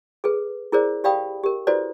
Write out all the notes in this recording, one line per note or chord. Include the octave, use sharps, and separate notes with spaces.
G#4 A4 B4
E4 G#4 A#4 C5 D5
G4 D5 F5 G5 B5 D#6
G4 A#4
E4 F#4 A4 B4 C5 D5